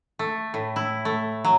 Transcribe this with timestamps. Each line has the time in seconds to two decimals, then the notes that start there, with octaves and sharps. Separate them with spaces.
0.19 A3
0.54 A2
0.76 E4
1.05 A3
1.45 F#3